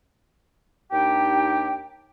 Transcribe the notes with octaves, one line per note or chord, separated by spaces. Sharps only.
D#2 D4 D#4 G4 G5